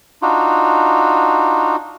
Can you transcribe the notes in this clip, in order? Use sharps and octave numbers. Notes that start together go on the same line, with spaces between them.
D4 D#4 F4 F#4